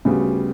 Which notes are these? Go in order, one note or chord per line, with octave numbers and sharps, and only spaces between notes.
D2 C#3 G3 B3 F#4